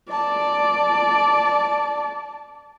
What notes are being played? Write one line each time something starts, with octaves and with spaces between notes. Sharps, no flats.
D5 A5